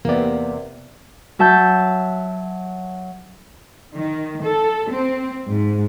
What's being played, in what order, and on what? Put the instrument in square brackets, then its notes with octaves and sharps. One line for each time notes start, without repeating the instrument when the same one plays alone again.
[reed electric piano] E2 D5 [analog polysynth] C3 [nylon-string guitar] A#3 B3
[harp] F#3 E5 A5 G6
[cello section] D#3
A4
C4
G#2